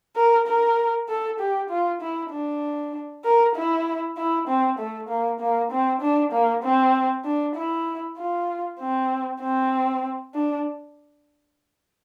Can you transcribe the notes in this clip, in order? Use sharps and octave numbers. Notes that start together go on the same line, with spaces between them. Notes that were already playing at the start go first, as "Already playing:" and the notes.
A#4
A#4
A4
G4
F4
E4
D4
A#4
E4
E4
C4
A3
A#3
A#3
C4
D4
A#3
C4
D4
E4
F4
C4
C4
D4